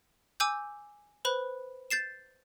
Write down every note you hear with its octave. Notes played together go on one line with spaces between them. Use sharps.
G#5 D6 E6 G6
B4 C5 B5 F#6
G6 A6 C7 E7